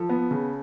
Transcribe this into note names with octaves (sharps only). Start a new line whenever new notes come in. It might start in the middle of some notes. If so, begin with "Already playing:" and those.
Already playing: F3 A4
B3
C#3